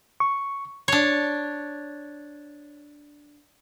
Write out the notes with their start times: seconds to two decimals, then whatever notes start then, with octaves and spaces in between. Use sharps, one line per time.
0.20 C#6
0.88 D4 C#5